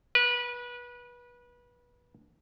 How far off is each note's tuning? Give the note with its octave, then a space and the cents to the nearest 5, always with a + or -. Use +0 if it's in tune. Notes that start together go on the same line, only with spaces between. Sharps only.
B4 -25